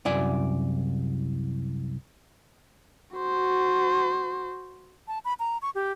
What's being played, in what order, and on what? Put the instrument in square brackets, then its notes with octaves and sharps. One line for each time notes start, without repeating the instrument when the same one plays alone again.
[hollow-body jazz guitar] C2 F#2 D5 G#5
[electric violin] F#4 C5
[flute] A5
B5
A#5
C#6
G4